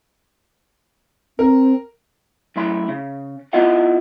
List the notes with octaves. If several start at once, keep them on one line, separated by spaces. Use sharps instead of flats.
C4 A#4
F#2 A2 E4 C6
C#3
B3 E4 F4 D#5 E5 F#5